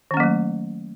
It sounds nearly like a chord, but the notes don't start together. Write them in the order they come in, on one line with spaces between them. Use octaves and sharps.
D#3 C#4 A#3 F#3 A3